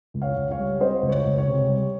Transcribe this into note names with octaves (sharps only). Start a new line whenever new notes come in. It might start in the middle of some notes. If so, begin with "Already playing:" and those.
C#2
C#5 F5
C#2
C#5 F5
G3
C4 C5 D#5
C#2
C#5
C#2
C#5
C3
G3